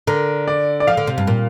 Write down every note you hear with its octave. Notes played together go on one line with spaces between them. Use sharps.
D3 A#4
D5
D5
F3 F5
D3
C3
G2
A#2